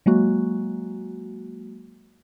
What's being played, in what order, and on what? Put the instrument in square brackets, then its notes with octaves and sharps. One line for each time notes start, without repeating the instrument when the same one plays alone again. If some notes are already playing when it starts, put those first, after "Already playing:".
[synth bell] F#3 G#3 A#3 F#4